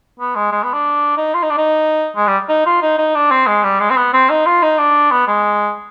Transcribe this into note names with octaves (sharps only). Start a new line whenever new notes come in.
B3
G#3
G#3
B3
D4
D#4
F4
D#4
D4
D#4
G#3
G3
D#4
F4
D#4
D#4
D4
C4
G#3
G3
G#3
C4
B3
C4
D#4
F4
D#4
D4
B3
G#3